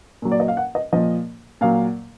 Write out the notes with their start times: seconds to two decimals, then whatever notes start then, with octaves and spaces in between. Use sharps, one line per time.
0.22 A#2 F#3
0.32 D5
0.40 D#5
0.48 F5
0.57 F#5
0.75 D#5
0.92 A#2 F3 D#5
1.61 A#2 F#3 F5